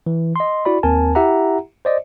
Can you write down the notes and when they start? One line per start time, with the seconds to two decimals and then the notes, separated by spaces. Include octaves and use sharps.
0.07 E3
0.36 D#5 C6
0.65 E4 F#4 D5 B5
0.83 D#2 C4 A#4 G#5 A5
1.15 E4 G4 E5 F#5 A#5
1.85 C5 D5 D#5